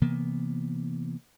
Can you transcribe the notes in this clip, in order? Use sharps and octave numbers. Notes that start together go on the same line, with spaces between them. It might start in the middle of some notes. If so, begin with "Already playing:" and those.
C3 E3 A#3 B3